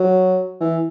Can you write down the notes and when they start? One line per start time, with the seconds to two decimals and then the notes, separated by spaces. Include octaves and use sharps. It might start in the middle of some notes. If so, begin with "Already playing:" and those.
Already playing: F#3
0.60 E3